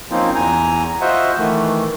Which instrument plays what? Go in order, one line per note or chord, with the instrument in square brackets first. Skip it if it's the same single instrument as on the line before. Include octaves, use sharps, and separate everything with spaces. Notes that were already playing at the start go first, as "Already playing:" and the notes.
[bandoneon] F3 A#3 C4 C#4 D#4 F4
E2 G#5 A#5
F4 F#4 C5 D#5 E5 F#5
D#3 E3 A3